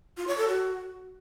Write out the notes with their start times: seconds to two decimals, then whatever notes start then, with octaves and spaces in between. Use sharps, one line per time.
0.17 F4
0.27 C#5
0.37 A4
0.48 F#4